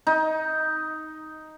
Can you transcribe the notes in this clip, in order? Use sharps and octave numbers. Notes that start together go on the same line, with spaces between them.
D#4